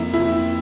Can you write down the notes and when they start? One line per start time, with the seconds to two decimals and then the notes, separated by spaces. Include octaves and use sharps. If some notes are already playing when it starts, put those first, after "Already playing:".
Already playing: F2 A#3 E4
0.14 F3 E4